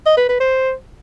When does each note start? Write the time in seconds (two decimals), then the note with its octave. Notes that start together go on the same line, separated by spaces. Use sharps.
0.06 D#5
0.17 B4
0.29 B4
0.40 C5